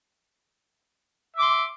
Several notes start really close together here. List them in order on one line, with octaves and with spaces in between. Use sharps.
E5 D6 C6